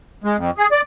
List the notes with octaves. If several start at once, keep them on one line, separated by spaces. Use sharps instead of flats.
G#3
F2
G#4
D5